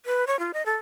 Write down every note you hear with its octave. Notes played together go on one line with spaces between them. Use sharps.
B4
C#5
F4
D#5
A4